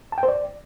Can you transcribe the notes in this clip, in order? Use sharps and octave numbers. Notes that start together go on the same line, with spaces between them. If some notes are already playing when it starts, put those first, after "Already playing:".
A5
G5
C5
D5